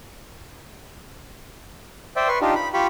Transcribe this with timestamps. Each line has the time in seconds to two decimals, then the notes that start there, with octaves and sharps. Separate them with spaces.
2.16 C5 D5 E5 G5
2.28 B4 C6 C#6
2.41 D4 D#4 F4 G4
2.55 B5
2.74 F4 G4 B5 C#6